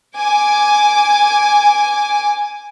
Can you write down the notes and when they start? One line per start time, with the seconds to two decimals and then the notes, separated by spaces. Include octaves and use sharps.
0.17 G#5 D6